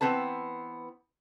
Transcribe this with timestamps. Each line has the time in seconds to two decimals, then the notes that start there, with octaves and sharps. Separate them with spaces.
0.01 E3 B3 C4 B4 A5